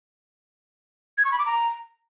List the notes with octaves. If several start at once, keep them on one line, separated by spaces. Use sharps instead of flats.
G#6
C#6
B5
D6
A#5